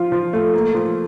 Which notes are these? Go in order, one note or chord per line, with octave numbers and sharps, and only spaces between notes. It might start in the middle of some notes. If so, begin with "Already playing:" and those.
Already playing: F3 F4
F3
A3
A#3
F3